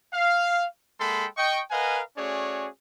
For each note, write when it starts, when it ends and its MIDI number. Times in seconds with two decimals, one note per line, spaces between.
0.12 0.65 77
1.00 1.26 56
1.00 1.26 58
1.00 1.26 69
1.00 1.26 79
1.00 1.26 83
1.00 1.26 84
1.37 1.61 75
1.37 1.61 79
1.37 1.61 85
1.71 2.01 70
1.71 2.01 71
1.71 2.01 75
1.71 2.01 77
1.71 2.01 78
1.71 2.01 80
2.17 2.67 57
2.17 2.67 61
2.17 2.67 66
2.17 2.67 68
2.17 2.67 73
2.17 2.67 74